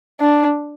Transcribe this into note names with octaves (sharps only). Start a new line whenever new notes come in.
D4